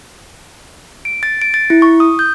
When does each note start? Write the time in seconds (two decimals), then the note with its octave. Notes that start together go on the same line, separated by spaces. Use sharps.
1.05 D7
1.23 A6
1.42 D7
1.54 A6
1.70 E4
1.82 C#6
2.00 D#6
2.19 G6